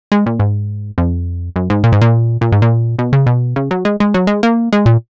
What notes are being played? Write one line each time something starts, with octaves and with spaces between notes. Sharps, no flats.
G#3
A#2
G#2
F2
F#2
G#2
A#2
G#2
A#2
A#2
G#2
A#2
B2
C#3
B2
C#3
F#3
G#3
G#3
F#3
G#3
A#3
G#3
A#2